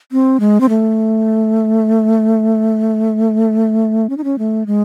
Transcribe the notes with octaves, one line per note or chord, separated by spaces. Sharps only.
C4
G#3
C4
A3
C#4
D#4
C#4
A3
G#3